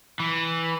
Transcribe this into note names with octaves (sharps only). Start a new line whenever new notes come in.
E3